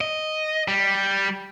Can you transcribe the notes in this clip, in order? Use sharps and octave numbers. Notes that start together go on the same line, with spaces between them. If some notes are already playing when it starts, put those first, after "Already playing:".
D#5
G3